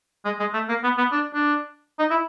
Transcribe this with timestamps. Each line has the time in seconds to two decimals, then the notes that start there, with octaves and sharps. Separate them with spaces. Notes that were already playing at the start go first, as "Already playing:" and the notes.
0.25 G#3
0.39 G#3
0.54 A3
0.69 A#3
0.83 B3
0.98 B3
1.12 D4
1.34 D4
1.99 D#4
2.10 E4